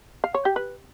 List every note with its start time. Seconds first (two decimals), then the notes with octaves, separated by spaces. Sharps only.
0.24 F5
0.34 C#5
0.45 G4
0.56 B4